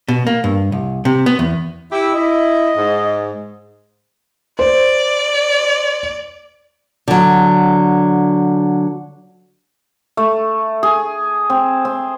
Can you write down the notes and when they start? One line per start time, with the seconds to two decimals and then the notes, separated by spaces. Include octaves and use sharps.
0.08 B2
0.27 A#3
0.44 G2
0.72 C2
1.05 C3
1.26 B3
1.39 E2
1.92 E4 G4
2.14 E4 D#5
2.77 G#2
4.59 C5 D5
7.08 D3 F#3
10.17 A3
10.83 G#4
11.50 C4
11.85 C4